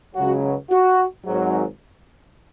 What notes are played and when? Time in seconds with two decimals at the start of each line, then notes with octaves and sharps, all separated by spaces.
0.15 C#2 C#3 F#3 F#4
0.70 F#4
1.25 G#1 G#2 F#3